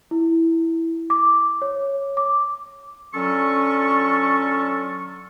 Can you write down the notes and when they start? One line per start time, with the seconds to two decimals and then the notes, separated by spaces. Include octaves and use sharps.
0.11 E4
1.10 D6
1.62 C#5
2.17 D6
3.14 D3 F#3 C#4 F4 A4 C#6